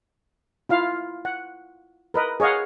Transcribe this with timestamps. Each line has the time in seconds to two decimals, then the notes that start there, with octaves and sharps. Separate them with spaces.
0.69 E4 F4 F5
1.25 F#5
2.14 A#4 B4 D#5
2.40 G#4 C#5 D#5 F5 F#5